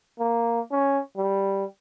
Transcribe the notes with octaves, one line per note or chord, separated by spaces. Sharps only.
A#3
C#4
G3